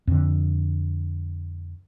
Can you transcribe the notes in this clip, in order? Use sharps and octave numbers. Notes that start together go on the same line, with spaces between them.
F2 D3